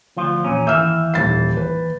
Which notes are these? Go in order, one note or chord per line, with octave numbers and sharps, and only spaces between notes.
D2 F3 F4
E2 A#2 C#4
D#2 E3 E5 E6 F6 G6
D#1 A6 C7
B4